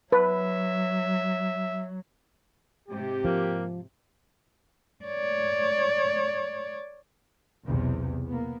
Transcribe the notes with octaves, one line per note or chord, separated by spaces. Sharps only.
F#3 B4 E5
G#2 C3 G4
F3 A#3
C#5 D5
B1 E2 C3
A#3 B3